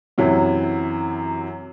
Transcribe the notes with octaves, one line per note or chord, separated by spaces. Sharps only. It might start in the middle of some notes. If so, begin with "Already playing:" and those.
F#2 C3 E3 F#3